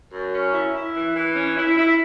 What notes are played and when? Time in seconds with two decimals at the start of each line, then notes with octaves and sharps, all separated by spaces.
0.12 F#2
0.32 C#4
0.53 E4
0.73 E4
0.95 E3
1.15 E3
1.35 C#4
1.57 E4
1.77 E4